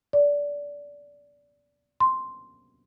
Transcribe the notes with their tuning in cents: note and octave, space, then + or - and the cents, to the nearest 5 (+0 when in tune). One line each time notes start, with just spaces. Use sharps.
D5 -20
C6 +0